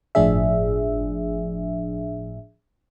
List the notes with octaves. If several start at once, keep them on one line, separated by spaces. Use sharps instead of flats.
G1 A2 F3 D4 G#4 E5